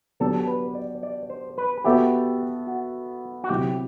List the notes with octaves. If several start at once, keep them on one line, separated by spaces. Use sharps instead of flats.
F#3 B3 D4 G4 A4
B4
D5
D5
C5
B4
B3 F#4 G4 A4 E5
F#4
F#4
C3 F#3 C4 E4 G4